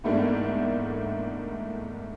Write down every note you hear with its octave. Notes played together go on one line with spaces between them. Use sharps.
E2 G#2 A3 A#3 D4